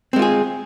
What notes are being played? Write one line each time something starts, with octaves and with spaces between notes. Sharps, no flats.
G#3 C4 F4 G#4